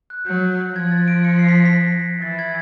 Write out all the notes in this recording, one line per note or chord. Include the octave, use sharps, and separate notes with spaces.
F#6
F#3 G6
F3 G#6
A6
D7
C#7
C7
B6
B6
A#6
E3 A6
G#6